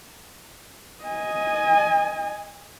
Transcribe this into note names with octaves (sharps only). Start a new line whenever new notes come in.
D#5 G#5